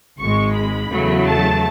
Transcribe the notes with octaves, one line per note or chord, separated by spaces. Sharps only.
G#1 G#2 G#3 C#6
B5
E2 C#3 F#3 A3
A5